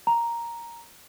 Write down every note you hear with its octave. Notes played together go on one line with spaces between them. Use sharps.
A#5